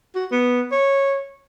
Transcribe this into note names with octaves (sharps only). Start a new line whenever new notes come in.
F#4
B3
C#5